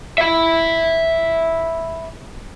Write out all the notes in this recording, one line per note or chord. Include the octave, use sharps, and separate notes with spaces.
E5 B5